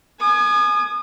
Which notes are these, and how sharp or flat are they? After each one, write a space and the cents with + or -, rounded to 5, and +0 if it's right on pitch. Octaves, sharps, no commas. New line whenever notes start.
G#5 +15 D#6 -35